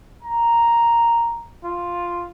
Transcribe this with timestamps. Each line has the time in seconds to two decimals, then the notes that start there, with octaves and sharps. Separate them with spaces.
0.23 A#5
1.65 F4